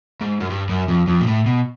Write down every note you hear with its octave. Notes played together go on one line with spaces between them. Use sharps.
G#2
F#2
G2
F#2
F2
F2
A#2
A2
B2